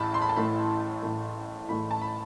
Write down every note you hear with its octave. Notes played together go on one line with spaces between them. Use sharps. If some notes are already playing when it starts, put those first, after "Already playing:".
Already playing: A1 A2 E3 A3 A5 B5
C6
B5
A5
A1 A2 E3 A3 B5
A1 A2 E3 A3
A1 A2 E3 A3 B5
A5
B5